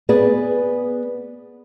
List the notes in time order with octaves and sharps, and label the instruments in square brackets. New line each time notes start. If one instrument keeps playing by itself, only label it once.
[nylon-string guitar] B3 G#4 D5